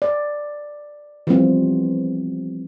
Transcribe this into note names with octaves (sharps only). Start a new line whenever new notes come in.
D5
E3 F3 G3 B3 C4 F4